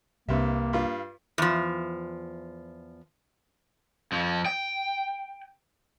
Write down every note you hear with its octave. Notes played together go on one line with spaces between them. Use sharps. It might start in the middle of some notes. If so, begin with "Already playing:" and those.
C2 G2 C3 A#3 E5
G2 F4
E2 F3
F2 F3
G5